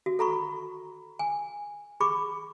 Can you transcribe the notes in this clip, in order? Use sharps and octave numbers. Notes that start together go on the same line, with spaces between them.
F#4
A4 A#5 B5 C#6
G#5
G#4 B5 C#6 D6